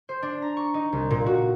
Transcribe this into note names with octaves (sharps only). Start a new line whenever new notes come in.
C5
D4
A#5
C#6
D#4
C2
A#2
F#4